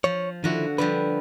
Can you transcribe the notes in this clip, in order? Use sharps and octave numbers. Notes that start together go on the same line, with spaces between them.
F3 C#5
D3 D#3 F3 E4 F#4
D3 F3 G3 B4